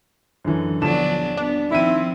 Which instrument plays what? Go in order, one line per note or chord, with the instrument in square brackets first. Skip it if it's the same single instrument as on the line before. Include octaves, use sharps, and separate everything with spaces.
[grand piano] F#2 D3 E3
[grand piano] D#1 A5 E7 [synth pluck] D3 F3 [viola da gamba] F#3 B3 D4
[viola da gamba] B3 [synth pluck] D4
[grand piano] D#3 D#7 [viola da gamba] F3 C4 [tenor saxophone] E4